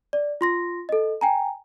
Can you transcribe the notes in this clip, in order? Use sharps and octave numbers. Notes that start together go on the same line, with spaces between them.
D5
F4 C6 A#6
A4 D#5
G5 G#5 A#5